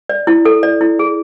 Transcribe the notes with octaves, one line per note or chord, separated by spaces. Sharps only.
D5
E4
A4
D5
E4
G#4